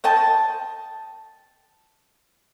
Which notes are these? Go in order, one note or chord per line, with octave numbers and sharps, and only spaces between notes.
C5 D#5 G5 A5